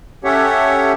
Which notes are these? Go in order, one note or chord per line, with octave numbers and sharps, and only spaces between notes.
C#4 G4 A4 C#5 E5 F#5